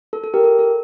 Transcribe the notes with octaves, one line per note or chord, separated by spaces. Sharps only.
A4
A4
G4 A#4
A4
A4